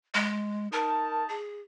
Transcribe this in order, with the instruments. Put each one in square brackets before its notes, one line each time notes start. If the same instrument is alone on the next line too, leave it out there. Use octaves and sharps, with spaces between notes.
[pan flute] G#3
[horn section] D#4 A5 [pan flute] A#4
[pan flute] G#4